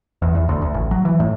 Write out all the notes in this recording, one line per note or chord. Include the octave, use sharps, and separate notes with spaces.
E2
E2
D2
D2
A1
F#3
E3
A2